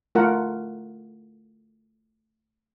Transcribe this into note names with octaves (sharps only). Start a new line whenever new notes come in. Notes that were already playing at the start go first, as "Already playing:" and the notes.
A3 F4 A#4 F#5